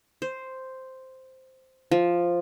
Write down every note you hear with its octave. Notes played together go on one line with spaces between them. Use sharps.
C5
F3